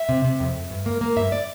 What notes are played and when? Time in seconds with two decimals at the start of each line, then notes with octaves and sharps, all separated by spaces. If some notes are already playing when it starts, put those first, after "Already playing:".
Already playing: E5
0.09 C3
0.25 C3
0.40 F2
0.55 F2
0.70 G2
0.86 A#3
1.01 A#3
1.16 G2 E5
1.32 D5